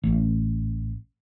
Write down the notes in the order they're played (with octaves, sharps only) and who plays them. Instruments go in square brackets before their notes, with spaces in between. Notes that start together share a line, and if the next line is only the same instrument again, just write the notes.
[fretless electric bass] A1